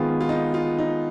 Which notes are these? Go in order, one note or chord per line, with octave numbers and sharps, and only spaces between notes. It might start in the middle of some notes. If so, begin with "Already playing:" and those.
Already playing: D#3 G#3 B3 F4
F4
D#4
F4
D#4